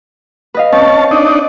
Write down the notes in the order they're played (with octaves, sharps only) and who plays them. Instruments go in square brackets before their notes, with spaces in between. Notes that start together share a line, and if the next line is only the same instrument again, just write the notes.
[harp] B4 D#5 F5
[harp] C4 [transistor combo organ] C#4 A5
[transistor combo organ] D4 D#4